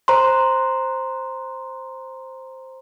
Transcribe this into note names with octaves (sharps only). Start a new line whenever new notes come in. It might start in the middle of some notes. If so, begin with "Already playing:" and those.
C5 A#5 C6